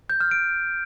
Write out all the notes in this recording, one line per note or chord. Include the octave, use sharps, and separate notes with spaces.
G6
F6
D7